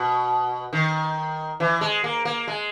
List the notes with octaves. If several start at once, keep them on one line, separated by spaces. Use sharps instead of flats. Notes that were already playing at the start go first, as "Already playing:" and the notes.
Already playing: B2
D#3
E3
G#3
A#3
A#3
G#3